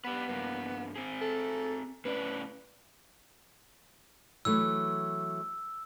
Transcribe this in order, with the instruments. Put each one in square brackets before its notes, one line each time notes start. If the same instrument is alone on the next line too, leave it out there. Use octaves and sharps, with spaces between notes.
[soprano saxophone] B3 [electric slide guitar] G4 B4
[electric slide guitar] G2 A#3
C4 G#4
[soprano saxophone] A4
[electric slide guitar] A2 C#4 D5 [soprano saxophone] B4
[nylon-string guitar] E3 F#3 A3 [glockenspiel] E6